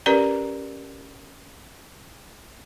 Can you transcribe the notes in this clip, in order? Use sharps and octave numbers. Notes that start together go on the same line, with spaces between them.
C#4 G4 A#4 B4 D5 A#5